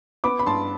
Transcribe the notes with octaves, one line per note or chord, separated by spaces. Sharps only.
B3 B5 D6
B5
G2 A5 C6